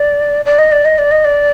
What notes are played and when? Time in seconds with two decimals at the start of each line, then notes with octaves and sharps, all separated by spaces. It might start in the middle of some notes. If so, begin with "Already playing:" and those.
Already playing: D5
0.45 D5
0.58 D#5
0.72 D5
0.85 D#5
0.98 D5
1.11 D#5
1.25 D5